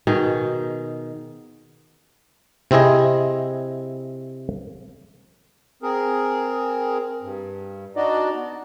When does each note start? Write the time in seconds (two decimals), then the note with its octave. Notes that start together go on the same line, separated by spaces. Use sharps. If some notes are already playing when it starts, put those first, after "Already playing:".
0.07 B2 D#3 D#4 G#4
2.71 C3 C4 E4 G#4 D#5
5.83 C4 G#4 A#4
7.22 G2
7.96 D4 D#4 F#4 D5 D#5
8.35 B3